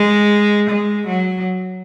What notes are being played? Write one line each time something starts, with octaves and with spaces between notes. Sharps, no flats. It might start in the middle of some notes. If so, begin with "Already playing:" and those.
Already playing: G#3
G#3
F#3